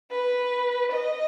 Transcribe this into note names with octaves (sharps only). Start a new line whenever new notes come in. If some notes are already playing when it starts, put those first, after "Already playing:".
B4
D#5